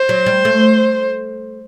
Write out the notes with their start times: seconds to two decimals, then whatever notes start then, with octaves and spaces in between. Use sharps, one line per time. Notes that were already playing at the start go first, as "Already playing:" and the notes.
Already playing: C5
0.09 F#3
0.26 G3
0.45 A3